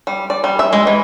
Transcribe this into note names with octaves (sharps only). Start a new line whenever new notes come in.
G3
D5
G3
E5
G#3
E3